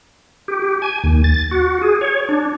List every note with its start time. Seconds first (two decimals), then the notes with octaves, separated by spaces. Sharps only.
0.48 G4
0.62 G4
0.82 G#5
1.04 D#2
1.24 A6
1.51 F#4
1.82 G#4
2.01 C#5
2.29 D4